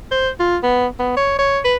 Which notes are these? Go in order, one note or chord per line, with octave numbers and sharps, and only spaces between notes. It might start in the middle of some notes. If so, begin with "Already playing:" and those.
C5
F4
B3
B3
C#5
C#5
B4